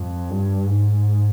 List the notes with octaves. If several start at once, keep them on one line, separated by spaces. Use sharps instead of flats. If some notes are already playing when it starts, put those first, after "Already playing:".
Already playing: F2
G2
G#2